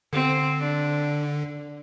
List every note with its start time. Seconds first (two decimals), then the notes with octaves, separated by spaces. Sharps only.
0.13 D3 C4
0.60 D4